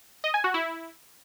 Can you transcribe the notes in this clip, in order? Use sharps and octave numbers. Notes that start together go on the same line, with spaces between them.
D#5
G#5
F#4
E4